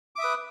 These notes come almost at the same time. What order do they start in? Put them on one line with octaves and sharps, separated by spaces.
D6 E5 D#6 B4